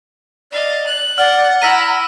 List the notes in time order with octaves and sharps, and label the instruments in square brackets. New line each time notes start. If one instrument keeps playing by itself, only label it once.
[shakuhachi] D5 [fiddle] D#5 F5
[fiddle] F#6
[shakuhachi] D5 [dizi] F#5 [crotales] F6
[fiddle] E4 [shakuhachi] A#5 [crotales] E6 B6 D#7